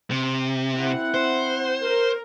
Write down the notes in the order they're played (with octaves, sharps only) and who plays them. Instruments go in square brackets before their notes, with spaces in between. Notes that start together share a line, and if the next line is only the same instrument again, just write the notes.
[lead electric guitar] C3
[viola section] C4 E4 F#5
[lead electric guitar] C5
[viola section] A#4